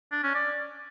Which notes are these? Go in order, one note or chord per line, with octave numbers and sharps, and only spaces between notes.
D4
C#4
D5